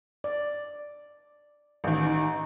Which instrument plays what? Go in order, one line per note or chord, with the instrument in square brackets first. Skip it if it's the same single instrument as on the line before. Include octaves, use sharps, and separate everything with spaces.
[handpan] D5
[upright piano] A1 D#3
[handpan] D#4